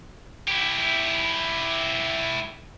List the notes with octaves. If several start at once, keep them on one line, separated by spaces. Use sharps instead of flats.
E4 G4